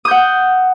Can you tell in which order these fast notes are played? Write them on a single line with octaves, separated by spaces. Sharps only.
D#6 G6 F#5